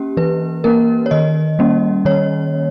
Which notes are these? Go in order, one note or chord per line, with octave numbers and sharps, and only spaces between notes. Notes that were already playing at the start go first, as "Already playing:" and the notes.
Already playing: A#3 C#4 G4
E3 B4
A#3 C#4 A#4
C#5
D#3 D#5
G3 A#3 C#4
D#3 C#5